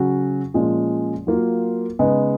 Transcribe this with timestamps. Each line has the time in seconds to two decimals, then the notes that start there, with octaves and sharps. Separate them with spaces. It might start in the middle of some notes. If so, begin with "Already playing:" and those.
Already playing: C#3 F#3 C#4 F#4
0.54 A#2 F3 G#3 C#4
1.27 F#3 A#3 F4
1.99 C#3 G#3 B3 D#4